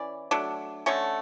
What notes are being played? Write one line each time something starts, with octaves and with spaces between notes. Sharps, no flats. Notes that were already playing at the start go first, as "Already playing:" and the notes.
Already playing: E3 C#4 D5
F#3 A3 D4
D3 A3 C#4 C#5